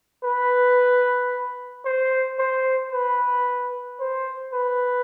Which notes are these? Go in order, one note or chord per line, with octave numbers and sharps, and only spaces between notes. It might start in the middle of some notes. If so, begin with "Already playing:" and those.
B4
C5
C5
B4
C5
B4